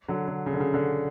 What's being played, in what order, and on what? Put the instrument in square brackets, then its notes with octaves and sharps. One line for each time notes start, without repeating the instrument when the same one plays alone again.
[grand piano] D3 F#3
D3
C#3
D3
C#3
D3